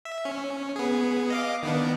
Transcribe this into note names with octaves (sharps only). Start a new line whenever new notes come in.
E5
C#4
B3 G#4
D#5 F5 D6
D#3 B3 D4